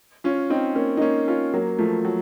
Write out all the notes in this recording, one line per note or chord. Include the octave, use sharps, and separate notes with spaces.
C#4 F4
C4 D#4
A#3 C#4
D#4
A#3 C#4
C#4 F4
F#3 A#3
F3 A3
F#3